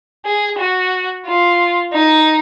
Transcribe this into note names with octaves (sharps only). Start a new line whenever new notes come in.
G#4
F#4
F4
D#4